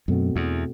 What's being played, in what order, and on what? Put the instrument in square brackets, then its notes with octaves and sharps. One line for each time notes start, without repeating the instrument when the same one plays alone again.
[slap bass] F#2 [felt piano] B2 A3 C4 F#4
[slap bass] E2